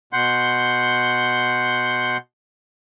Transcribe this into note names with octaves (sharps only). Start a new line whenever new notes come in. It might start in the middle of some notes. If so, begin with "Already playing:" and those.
B2 F#5 C6 G6